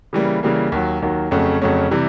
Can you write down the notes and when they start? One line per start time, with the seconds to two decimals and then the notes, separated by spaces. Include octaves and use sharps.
0.13 C#3 E3 G3 A#3
0.43 C#3 E3 G3 A#3
0.72 D#2 D#3 F#3
1.02 D#2 D#3 F#3
1.31 F2 C#3 F#3 A3 C#4
1.62 F2 C#3 F#3 A3 C#4
1.91 C3 E3 G3